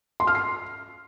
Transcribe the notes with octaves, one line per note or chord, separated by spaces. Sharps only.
C6
F6
C7